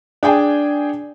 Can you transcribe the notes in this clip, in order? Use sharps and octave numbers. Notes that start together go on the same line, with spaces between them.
D4 G#4 G5 G#5